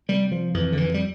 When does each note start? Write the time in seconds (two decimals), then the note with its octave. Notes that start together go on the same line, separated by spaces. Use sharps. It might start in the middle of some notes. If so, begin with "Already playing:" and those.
0.09 C3 G3
0.32 F3
0.54 F2 E3
0.72 D3
0.77 E3
0.94 G3